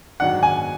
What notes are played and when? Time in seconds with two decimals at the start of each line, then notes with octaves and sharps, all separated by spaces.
0.20 G#2 D#3 F#3 D4 F#5
0.43 G#5